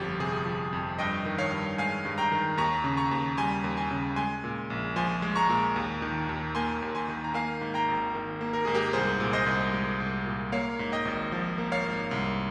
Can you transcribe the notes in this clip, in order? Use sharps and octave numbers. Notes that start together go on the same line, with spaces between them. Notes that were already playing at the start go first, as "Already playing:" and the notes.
Already playing: G1 F2 F3 G4
C3 G#4
F3
F2
G2 D#5 G5
D#3
C#5 F5
G2
G#3 F5 G#5
G2
G5 A#5
D#3
D#2 A#5 C#6
C#3
A#5 C#6
D#2
G3 G#5 C6
D#2
G#5 C6
C#3
G#3 G#5 C6
A#2
A#1
F3 G#5 C6
G#3
A#5 C#6
A#2
D#2
D#3
D#2
A#3 G#5 C6
D#2
G#5 C6
D#3
A#5
A#3 F5 G#5
G#2
G5 A#5
G#1
D#3
A#3
A#4
G#2 G#4
G4 A#4
C2 G#4 C5
A#2
C5 D#5
C2
G#3
C2
A#2
A#3 C#5 F5
G#2
D#5 G5
G#1
F3
A#3
C#5 F5
G#2
C2